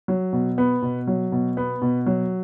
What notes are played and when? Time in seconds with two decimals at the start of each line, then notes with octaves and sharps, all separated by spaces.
0.08 F#3
0.33 B2
0.58 B3
0.82 B2
1.07 F#3
1.32 B2
1.57 B3
1.82 B2
2.06 F#3